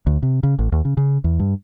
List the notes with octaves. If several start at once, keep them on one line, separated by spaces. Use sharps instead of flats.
D2
C3
C#3
A1
D#2
C#3
C#3
E2
G2